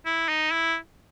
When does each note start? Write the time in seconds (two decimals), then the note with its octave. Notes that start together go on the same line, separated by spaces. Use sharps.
0.05 E4
0.28 D#4
0.51 E4